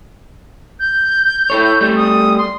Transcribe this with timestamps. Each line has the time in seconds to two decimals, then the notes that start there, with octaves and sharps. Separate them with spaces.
0.79 G6
1.50 E4 A4 C#5
1.81 G3 A3
1.95 D#6
2.38 C6